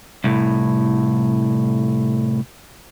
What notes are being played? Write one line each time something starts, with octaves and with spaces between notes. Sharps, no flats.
C2 A2